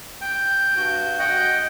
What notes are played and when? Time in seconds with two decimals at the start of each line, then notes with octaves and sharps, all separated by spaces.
0.21 G5
0.77 G2 F#4 G6
1.19 D#5 F#5 G5